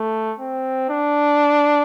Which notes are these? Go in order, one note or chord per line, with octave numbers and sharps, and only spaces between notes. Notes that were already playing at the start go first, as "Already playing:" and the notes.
Already playing: A3
C4
D4